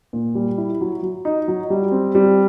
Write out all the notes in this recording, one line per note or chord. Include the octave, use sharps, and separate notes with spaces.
A#2
G3
E4
F#3
F#3
D#4
F#3
G3
C4
G3